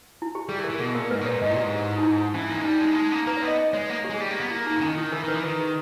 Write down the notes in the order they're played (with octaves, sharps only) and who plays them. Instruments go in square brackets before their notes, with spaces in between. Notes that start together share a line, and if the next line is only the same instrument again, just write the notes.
[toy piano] E4
G4
[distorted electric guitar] G3 [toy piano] G#4
[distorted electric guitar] E3
[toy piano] A#4
[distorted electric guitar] E3
[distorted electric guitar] B2 [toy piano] G#4
[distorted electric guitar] A#2 [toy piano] A#4
[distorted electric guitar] G#2 [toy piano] B4
[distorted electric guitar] B2
[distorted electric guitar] A#2 [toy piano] C#5
[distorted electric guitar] G#2 [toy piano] D#5
[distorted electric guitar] A#2 [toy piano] E4
[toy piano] G4
[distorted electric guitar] G#2
[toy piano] D#4
E4
[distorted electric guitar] E3 [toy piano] C#4
[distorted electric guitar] A#3
G#3
[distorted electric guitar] G3 [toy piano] D#4
[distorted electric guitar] G#3 [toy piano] D#4
[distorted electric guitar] A#3
[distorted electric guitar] G#3 [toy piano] D#4
[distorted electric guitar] A#3 [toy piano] C#4
[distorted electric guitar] A#3 [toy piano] B4
[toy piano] C#5
[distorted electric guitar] B3
[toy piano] D#5
D#5
[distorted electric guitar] G#3 [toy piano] C#5
[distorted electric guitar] A#3 [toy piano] C#5
[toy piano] G4
[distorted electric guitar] G#3 [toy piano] G#4
[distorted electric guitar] G3 [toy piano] G4
[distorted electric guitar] A#3
B3
[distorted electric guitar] A#3 [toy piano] E4
[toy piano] D#4
[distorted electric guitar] C#3
[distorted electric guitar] D#3 [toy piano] C#4
[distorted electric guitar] D#3 [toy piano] E4
[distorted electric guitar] E3 [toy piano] A#4
[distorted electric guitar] D#3 [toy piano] B4
[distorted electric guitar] E3
[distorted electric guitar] D#3 [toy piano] B4
[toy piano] G#4